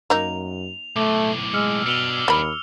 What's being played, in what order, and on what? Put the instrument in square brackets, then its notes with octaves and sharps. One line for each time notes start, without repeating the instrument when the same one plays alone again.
[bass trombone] F#2 [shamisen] A#3 D#4 [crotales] F7
[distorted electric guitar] B1 A2 [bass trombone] A3 [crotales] D6
[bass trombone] G#3 [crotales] E6 F6 C#7
[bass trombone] B2 [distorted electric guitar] D4 B4 [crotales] C#7 F7 G7
[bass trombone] D#2 [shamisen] A#3 B5